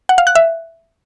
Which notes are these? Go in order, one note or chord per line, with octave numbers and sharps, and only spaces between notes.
F#5
F5
F#6
E5